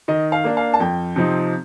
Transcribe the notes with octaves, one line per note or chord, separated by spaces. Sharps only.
D#3 D#5
F5
A#3 D4
F5
A5
F2 G5
C3 F3 C4 D#4